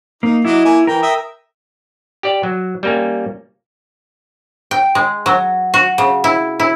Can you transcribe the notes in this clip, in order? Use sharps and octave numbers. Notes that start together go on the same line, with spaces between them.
A#3 D#4
F#3 E4 D#5 D6
A#3 G#5
E3 A#4 G5
E5 G5 D#6
G4 D5
F#3
G3 A#3 C#4
G5
G#3
F#3
F#4
C#3
E4
E4